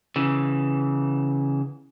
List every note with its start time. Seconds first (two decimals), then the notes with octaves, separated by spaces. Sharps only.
0.16 C#3 E3